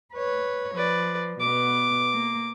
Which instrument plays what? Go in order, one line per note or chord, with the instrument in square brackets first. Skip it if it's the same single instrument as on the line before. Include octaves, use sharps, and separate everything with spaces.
[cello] B4 C#5
[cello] F3 [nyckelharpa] B4 D5
[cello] B2 B3 [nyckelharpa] D6
[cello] A#3